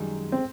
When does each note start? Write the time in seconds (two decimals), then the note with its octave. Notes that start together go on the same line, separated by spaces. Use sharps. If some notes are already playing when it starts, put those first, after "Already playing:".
Already playing: F#2 D#3 G3 G#3
0.32 C4